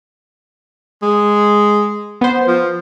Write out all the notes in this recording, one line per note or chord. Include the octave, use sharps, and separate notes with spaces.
G#3
B3 C5
F3